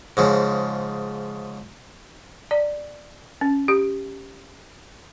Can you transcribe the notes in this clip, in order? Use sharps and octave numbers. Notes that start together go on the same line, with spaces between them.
G#2 C#3 F3
D5
C#4
G4